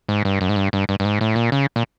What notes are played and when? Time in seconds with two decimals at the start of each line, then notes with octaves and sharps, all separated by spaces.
0.08 G#2
0.25 G2
0.41 F#2
0.49 G#2
0.56 G2
0.73 G2
0.89 G2
1.00 G2
1.05 G#2
1.21 A2
1.36 A#2
1.52 C#3
1.76 A#2